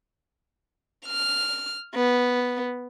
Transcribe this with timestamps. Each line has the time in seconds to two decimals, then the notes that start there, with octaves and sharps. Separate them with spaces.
1.06 F6
1.95 B3